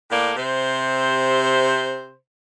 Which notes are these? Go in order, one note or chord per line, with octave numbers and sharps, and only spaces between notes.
A2 A#3 A4 D5
C3 C5